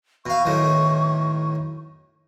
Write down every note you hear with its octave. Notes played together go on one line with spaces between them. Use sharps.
B2 F5 C#6
B1 A2 D#3